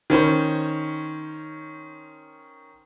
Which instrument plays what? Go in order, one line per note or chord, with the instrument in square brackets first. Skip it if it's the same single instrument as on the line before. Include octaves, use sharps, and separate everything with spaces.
[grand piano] D#3 C#4 C5